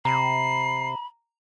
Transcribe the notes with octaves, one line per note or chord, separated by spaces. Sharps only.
C3 A#5 B5 C7